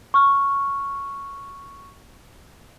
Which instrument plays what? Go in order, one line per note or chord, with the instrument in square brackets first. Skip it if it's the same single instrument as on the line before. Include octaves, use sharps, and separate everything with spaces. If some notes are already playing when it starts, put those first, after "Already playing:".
[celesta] C#6 F6